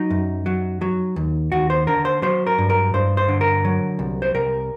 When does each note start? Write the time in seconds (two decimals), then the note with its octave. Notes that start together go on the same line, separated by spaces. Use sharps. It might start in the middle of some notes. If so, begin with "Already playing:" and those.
Already playing: F#3 D#4
0.10 F#2
0.46 F#3
0.81 F#3
1.16 D#2
1.52 D#2 F#4
1.70 C5
1.87 D3 A#4
2.05 C5
2.22 F#3 C5
2.47 A#4
2.58 G2
2.70 A#4
2.94 G2 C5
3.17 C5
3.28 D3
3.41 A#4
3.65 F#3
3.99 C2
4.22 C5
4.35 C2 A#4